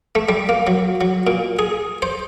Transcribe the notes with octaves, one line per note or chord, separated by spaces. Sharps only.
A3
G3
A#3
F#3
F#3
A#2
G#4
C5